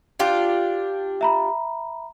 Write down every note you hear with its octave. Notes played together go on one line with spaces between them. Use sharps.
D4 F4 G4
E5 A#5 B5